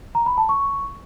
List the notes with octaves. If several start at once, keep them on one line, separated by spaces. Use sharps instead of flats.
A#5
B5
A5
C#6